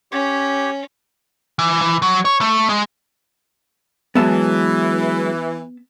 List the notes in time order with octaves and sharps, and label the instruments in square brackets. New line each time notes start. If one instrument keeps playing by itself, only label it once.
[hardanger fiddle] C#4 [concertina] G4 C#5
[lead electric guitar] E3
E3
F#3
C#5
A3
G#3
[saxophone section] E3 [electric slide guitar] F#3 G#3 [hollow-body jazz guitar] B3 E5 A5